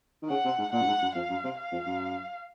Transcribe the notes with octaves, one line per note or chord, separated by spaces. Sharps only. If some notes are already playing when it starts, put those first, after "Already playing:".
D#3
C#3 F#5
C3
G#2
A#2 F#5
F#2
G#2
F#2
F2 F5
F#2
C3
F5
F2
F#2